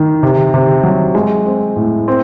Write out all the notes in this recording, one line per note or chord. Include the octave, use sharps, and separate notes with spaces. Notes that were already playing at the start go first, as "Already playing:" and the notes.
Already playing: D#3
C3
C3
F#3
G#3
C4
A2
C4